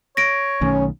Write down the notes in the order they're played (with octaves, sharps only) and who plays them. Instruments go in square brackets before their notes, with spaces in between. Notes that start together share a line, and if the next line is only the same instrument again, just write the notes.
[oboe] C#5 [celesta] A#6 D7
[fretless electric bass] B1 D#3 A3 [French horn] C#4